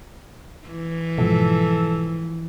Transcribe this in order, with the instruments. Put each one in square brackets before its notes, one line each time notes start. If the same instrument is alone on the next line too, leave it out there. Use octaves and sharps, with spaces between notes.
[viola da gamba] E3
[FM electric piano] G#2 F3 [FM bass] B2 [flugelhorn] A4